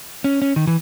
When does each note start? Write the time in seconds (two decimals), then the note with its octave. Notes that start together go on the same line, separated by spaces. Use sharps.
0.24 C#4
0.42 C#4
0.56 D#3
0.67 E3